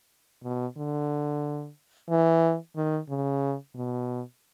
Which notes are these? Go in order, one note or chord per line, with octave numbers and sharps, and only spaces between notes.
B2
D3
E3
D#3
C#3
B2